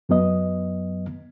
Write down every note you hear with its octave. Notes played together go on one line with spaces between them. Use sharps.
F#2 F#3 B3 D#5